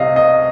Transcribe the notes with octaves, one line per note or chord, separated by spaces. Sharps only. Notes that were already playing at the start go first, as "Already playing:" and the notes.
Already playing: C2 C3 G3 D#5 F5
D#5